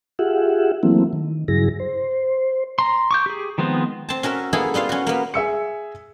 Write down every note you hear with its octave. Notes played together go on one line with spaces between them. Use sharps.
F4 G4 G#4 E5 F#5
E3 F#3 A3 A#3 C4 E4
D#3
G2 C#3 F#3 E4 G#4 A#6
C5
A#5 C6
C#6 D6 G6
G4 G#4
D#3 F3 G#3 B3 C4
C4 A5
C#4 F#4 A#4 E5
A#3 B3 E4 G#4 A4
G3 B3 F4 F5
C#4 F#4
A#3 B3
G#4 E5 E6 C#7